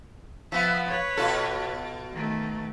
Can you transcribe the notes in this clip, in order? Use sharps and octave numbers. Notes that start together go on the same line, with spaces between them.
F3 B3 E5
B4 C#5
B2 F4 A4
D#3 A3